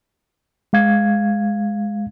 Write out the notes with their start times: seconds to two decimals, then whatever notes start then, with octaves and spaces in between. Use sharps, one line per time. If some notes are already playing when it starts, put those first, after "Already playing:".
0.73 G#3 F5 G#6